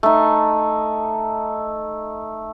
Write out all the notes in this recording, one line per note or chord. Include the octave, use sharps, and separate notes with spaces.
A3 D#4